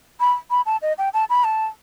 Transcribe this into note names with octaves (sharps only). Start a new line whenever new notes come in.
B5
B5
A5
D#5
G5
A5
B5
A5